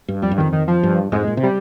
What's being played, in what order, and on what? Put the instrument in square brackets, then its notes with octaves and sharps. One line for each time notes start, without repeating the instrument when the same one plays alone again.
[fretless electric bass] G2
[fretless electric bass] F2 [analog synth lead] G3
[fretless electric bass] G2
[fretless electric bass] F2 [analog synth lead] D#3
[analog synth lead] D#3
F3
[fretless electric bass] G2
[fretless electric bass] F2 G#2 [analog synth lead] G#3
[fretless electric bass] A#2
C3
[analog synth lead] G3